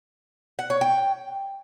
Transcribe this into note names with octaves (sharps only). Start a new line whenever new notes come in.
F#5
C#5
G5